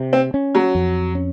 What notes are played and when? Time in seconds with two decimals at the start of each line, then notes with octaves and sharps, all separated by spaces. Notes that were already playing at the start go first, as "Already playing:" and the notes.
Already playing: C3
0.13 C4
0.34 C#4
0.55 F#3
0.75 F2
1.15 C#4